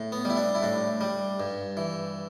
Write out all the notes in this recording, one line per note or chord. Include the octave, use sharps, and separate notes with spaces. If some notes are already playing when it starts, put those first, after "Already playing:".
Already playing: A2
B3
G3 E4
D4
E4
A2 D4
G3
G2
E3